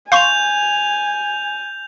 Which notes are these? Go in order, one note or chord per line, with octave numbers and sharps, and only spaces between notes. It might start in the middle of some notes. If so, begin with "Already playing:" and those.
F5 G#5 C6 C#6 G6 F7